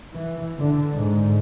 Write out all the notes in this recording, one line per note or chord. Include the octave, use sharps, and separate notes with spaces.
E3
D3
G#2